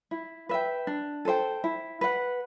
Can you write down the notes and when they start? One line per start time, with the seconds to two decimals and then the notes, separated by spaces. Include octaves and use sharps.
0.11 E4
0.49 B4 E5 G5
0.87 D4
1.25 A4 C5 G5
1.64 E4
2.01 B4 F#5